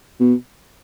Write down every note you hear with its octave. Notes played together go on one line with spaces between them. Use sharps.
B2